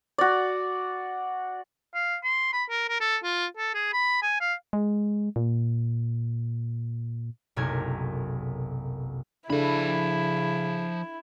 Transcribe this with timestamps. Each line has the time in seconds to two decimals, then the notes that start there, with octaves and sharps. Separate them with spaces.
0.18 F#4 D5
1.95 F5
2.23 C6
2.53 B5
2.70 A#4
2.89 A#4
3.00 A4
3.23 F4
3.57 A4
3.74 G#4
3.93 B5
4.22 G#5
4.40 F5
4.73 G#3
5.36 A#2
7.56 F#1 B1 C3 A3 A#4 G#6
9.50 C#3 F3 D4 E4 A4 B5